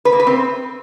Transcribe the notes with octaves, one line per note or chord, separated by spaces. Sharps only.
B4
A#3
B4
C4